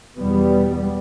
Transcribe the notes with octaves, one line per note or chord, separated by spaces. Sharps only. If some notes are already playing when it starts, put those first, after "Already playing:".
E2 B2 G3 B3